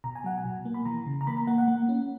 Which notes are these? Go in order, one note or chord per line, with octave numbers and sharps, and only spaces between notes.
B2 A#5
G#5
F#3 F#5
G#5
B2
A#3
B5
E3 A#5
C#3
A#5
A#3 B5
A#5
A#3 F#5
F#5
A#3
C#4